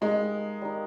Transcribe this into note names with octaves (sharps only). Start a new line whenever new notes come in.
G3 G#3 A#3 D#4
G3 A#3 D#4